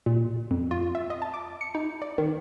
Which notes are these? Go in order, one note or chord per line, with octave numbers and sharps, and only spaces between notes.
A#2
F2
F4
E5
D#5
A5
D6
C#7
D#4
D5
D#3